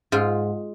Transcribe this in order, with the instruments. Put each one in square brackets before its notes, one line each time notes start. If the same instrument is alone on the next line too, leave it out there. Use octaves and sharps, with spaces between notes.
[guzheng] G#2 F4